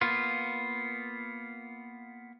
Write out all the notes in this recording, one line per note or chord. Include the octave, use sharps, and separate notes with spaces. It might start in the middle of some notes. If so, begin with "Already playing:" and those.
A#3 B3 F4